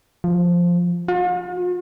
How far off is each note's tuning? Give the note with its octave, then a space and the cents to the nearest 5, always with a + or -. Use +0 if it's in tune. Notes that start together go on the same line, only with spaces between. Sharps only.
F3 +0
F4 +45